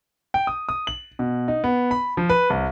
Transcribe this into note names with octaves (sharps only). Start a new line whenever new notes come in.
G5
D#6
D#6
F#7
B2
D#4
B3
B5
F3
B4
C2